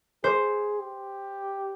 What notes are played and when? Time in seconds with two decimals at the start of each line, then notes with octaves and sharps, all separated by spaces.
0.24 G#4 C5
0.79 G4